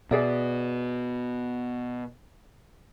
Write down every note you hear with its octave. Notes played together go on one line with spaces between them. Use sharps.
B2 G#4 D5 E5